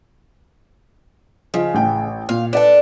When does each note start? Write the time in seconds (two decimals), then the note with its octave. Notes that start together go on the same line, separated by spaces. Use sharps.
1.54 C#3 F3 D#5
1.74 A1 G5
2.29 A#2 F5
2.53 D4 A4 B4 D5